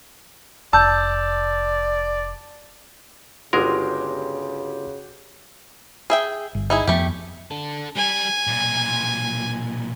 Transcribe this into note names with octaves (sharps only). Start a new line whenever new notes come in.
F1 D5 A5 E6 G6
G1 C#3 G#3 F#4 G4 A#4 C6
G#4 E5 G5
G1
D#4 E4 G#4
F2 F3 A3 B3 G4
D4 A4
G3 G#5
B1 A#2